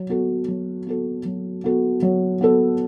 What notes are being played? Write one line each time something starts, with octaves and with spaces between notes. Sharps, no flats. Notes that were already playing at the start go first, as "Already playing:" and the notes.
Already playing: F#3
B3 F#4 A4
F#3
B3 F#4 A4
F#3
B3 F#4 A4
F#3
B3 F#4 A4